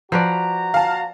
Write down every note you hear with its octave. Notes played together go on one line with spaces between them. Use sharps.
F3 F#4 B4 D5 A#5
F5 A5